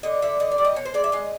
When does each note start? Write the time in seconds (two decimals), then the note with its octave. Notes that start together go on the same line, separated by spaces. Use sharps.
0.03 D3 D#5
0.22 D3 E5
0.40 D3 D#5
0.52 D5
0.58 G3
0.65 D#5
0.76 B2 C#5
0.85 C5
0.94 G#3 D5
1.04 E5
1.12 G#3 D#5